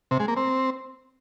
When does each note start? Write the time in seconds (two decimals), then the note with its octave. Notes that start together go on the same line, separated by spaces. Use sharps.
0.11 C3
0.20 G#3
0.28 A#3
0.37 C4